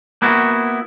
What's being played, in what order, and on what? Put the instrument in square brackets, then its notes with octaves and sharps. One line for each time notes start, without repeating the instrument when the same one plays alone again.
[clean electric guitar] A#3 B3 E4 F#4